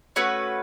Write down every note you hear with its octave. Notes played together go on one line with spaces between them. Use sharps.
A3 C#4 F#4 B4